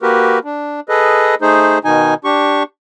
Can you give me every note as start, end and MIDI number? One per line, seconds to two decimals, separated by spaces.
0.02 0.39 58
0.02 0.39 66
0.02 0.39 67
0.02 0.39 70
0.02 0.39 71
0.45 0.80 62
0.89 1.35 68
0.89 1.35 69
0.89 1.35 71
0.89 1.35 75
1.42 1.78 57
1.42 1.78 63
1.42 1.78 68
1.42 1.78 72
1.85 2.14 47
1.85 2.14 51
1.85 2.14 63
1.85 2.14 80
2.25 2.63 62
2.25 2.63 67
2.25 2.63 85